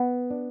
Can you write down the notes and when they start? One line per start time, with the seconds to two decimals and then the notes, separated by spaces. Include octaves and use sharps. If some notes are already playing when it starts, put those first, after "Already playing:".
Already playing: B3
0.31 D4